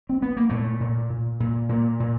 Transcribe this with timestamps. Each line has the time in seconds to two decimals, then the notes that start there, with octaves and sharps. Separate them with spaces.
0.09 C4
0.22 B3
0.37 A#3
0.50 A#2 A3
0.80 A#2
1.10 A#2
1.40 A#2
1.69 A#2 A#3
2.00 A#2